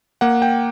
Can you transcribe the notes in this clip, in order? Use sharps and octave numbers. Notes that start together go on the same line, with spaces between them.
A#3 F#5
G5